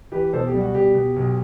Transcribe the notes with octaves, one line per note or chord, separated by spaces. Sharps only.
E3 G4 B4
B2 A4 C5
G4
G3
F#4
B2 G4
B2
B1